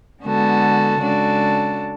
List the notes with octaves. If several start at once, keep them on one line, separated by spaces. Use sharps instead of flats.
D3 G#3 B3 F#4 A4
C#3 G#3 D4 F#4 A4